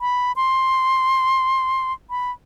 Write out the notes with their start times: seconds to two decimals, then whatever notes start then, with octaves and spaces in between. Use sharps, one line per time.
0.01 B5
0.36 C6
2.10 B5